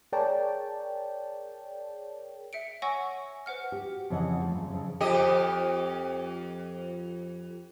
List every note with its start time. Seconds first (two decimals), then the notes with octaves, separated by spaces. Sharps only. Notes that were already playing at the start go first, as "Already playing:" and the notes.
0.13 G#4 A#4 C#5 D5 G5 A5
2.53 E5 C#7 D7
2.82 C#5 F#5 G#5 C#6 E6 A#6
3.46 B4 C5 F#5 F6
3.72 F#4 G4
4.10 F2 C#3 E3 D#5 F#5
4.38 F3 A3
4.54 F#2 C#3
4.70 F2 C#3
5.01 F2 G4 D#5